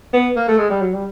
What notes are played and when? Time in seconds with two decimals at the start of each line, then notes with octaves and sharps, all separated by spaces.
0.13 B3
0.36 A#3
0.48 A3
0.58 G#3
0.70 G3
0.81 F#3
0.94 G3